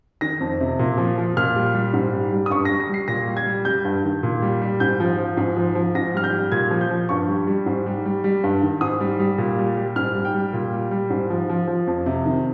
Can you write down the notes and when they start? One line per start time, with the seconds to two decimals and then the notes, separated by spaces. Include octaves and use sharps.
0.21 D#3 A#6
0.41 F2
0.60 C3
0.79 A#2
0.98 F3
1.18 F3
1.37 A#2 F6
1.56 G3
1.75 G3
1.93 G#2
2.13 G3
2.32 G3
2.46 D#6
2.50 G2 C#6
2.65 A#6
2.71 G3
2.80 A#6
2.89 G3 C7
3.08 A#2 A#6
3.28 G3
3.37 G#6
3.46 G3
3.65 G3 G6
3.85 G2
4.04 D#3
4.23 A#2
4.42 G3
4.62 G3
4.80 G#2 G6
5.00 F3
5.18 F3
5.37 G#2
5.57 F3
5.75 F3
5.95 G#2 A#6
6.14 G3 F6
6.24 G6
6.33 G3
6.52 A#2 G#6
6.71 F3
6.81 G6
6.91 F3
7.09 G2 C#6
7.28 G3
7.47 G3
7.66 G#2
7.86 G3
8.06 G3
8.24 G3
8.44 G2
8.63 D#3
8.81 G#2 D#6
9.00 G3
9.19 G3
9.38 A#2
9.58 G3
9.77 G3
9.96 G#2 F6
10.15 G3
10.25 G5
10.34 G3
10.53 A#2
10.73 G3
10.91 G3
11.10 G#2
11.30 F3
11.50 F3
11.68 F3
11.87 F2
12.06 C3
12.26 D#3